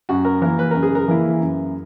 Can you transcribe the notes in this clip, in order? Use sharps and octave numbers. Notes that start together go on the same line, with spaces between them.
F#2 F#4
A#4
E3 A#3 E4 A#4
B4
F#2 A#4
G#4
A#4
E3 A#3 E4
F#2